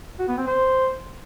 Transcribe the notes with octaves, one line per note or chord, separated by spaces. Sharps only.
F#4
B3
C4
C5